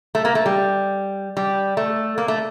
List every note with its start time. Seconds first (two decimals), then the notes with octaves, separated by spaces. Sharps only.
0.15 A3
0.25 A#3
0.35 A3
0.46 G3
1.37 G3
1.77 A3
2.18 A#3
2.28 A3